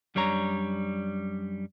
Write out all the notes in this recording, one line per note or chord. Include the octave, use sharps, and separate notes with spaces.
F#2 G3 D4 C#5 A#5